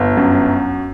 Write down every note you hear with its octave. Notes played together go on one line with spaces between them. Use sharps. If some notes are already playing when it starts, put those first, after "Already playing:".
Already playing: G1
F#2